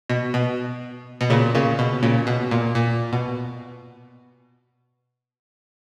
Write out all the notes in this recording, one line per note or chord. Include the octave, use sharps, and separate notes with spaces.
B2
B2
B2
A#2 C#3
A#2 C#3
B2
A#2 C#3
B2
A#2
A#2
B2